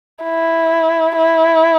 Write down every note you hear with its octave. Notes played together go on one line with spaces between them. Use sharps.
E4
E4